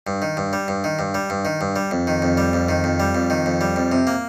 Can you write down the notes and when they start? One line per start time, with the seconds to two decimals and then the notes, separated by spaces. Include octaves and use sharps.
0.07 G2
0.22 D#3
0.37 G2
0.53 G3
0.68 G2
0.84 D#3
0.99 G2
1.14 G3
1.30 G2
1.45 D#3
1.61 G2
1.76 G3
1.91 F2
2.07 D#3
2.22 F2
2.37 G3
2.53 F2
2.69 D#3
2.84 F2
3.00 G3
3.15 F2
3.30 D#3
3.46 F2
3.61 G3
3.76 F2
3.92 C3
4.07 A#3